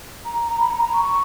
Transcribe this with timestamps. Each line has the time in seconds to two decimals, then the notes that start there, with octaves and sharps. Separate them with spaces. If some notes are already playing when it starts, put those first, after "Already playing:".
0.25 A#5
0.48 A#5
0.59 B5
0.71 A#5
0.82 A#5
0.94 C#6